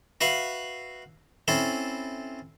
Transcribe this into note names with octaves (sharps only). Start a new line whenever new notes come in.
F#4 B4 E5 F5
C4 C#4 E4 A4